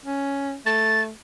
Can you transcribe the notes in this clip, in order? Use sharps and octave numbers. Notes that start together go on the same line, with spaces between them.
C#4
A3 A6